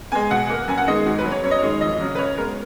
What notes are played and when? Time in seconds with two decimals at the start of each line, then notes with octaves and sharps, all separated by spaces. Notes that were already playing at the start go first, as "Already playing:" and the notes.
0.12 G#3 B3 G#5
0.31 B2 F#5
0.49 A#3
0.68 F#2 G#5
0.78 F#5
0.88 D#3 G#3 B3 D#5
0.96 G#4
1.06 G#2 F#4
1.19 B4
1.25 F#3 B3
1.31 C#5
1.44 F#2 C#5
1.51 D#5
1.58 D#3 G#3 C#5
1.81 F2 D#5
2.00 C#3 F#3
2.15 B4
2.18 C#3 C#5
2.38 G#3 B3 A#4